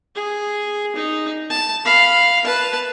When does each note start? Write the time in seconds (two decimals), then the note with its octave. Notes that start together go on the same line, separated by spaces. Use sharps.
0.15 G#4
0.95 D#4
1.50 A5
1.85 F5 B5
2.44 B4 A5